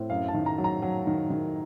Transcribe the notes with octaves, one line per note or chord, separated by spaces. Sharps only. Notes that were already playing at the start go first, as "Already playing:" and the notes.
Already playing: A2 C4
F#2 F5
A5
D#3
A#5
F#3
A#5
F#3
D#3
D#3